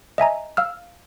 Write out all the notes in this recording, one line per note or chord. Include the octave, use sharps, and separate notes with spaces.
D#5 E5 G#5 A#5
F5 E6 F6